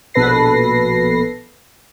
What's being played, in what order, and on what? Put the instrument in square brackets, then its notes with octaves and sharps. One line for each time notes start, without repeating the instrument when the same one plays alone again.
[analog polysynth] A#1 B2 A4 B4 A#6 C7